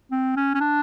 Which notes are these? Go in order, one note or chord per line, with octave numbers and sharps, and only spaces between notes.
C4
C#4
C#4
D4